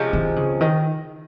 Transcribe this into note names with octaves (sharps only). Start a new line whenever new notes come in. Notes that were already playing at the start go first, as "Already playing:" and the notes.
Already playing: C3 F3 G#3 C#4
D#3
C#3
D#3